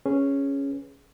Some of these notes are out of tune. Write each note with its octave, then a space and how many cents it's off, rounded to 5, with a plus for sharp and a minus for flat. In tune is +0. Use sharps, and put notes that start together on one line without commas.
C#4 +0 G#4 +0 B4 +0